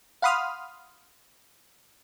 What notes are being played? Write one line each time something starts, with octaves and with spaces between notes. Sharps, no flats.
F5 F#5 B5 C6 D#6 F6